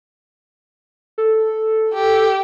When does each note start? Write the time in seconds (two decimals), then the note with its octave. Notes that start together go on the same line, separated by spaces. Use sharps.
1.18 A4
1.94 G4